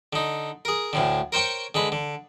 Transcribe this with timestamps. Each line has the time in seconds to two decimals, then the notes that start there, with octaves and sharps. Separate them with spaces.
0.13 D3 D#4
0.65 G#4 A#4
0.93 D2 A2 D3
1.32 A#4 C5 C#5 G5 C#6
1.75 D3 G#3 B4
1.92 D3